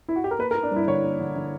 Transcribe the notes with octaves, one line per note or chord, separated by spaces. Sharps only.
E4
F#4
G4
A#4
A#3 B4
A#4
A#3
D4
G2 E4
D3 C#5
A#3
D3
D3